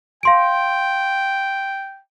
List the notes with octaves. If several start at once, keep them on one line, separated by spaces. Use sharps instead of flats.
F5 G5 C6 D7